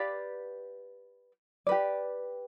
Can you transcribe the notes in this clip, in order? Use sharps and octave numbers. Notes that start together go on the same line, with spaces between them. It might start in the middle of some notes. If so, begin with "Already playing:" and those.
Already playing: G4 B4 D5 F5
G4 B4 D5